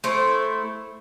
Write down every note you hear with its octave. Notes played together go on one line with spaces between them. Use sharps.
A3 E4 C5